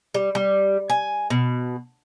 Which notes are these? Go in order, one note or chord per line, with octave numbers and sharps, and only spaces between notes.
G3
G3
G#5
B2